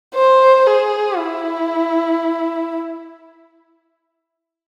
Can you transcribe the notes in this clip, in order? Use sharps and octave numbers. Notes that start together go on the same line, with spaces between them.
C5
G#4
E4